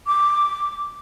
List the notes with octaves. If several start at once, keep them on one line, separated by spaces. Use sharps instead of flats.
D6